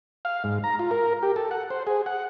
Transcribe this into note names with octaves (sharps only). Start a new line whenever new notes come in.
F5
G#2
A#5
F4
A#4
G4
A4
F#5
C5
G#4
F#5